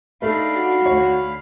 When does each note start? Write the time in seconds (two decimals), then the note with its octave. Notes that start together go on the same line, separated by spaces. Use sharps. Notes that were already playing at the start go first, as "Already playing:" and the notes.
0.22 A3 D4 D#4 F5 B5
0.56 F#4
0.86 D2 C#5